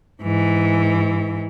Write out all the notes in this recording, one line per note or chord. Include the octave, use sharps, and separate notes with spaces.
G#2 E3